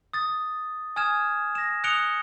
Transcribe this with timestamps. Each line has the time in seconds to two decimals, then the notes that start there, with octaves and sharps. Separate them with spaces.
0.13 D#6 A6
0.96 G#5 D#6 F6 G#6 E7
1.55 A#6 E7
1.84 D#6 F#6 C#7 D7 F7 G7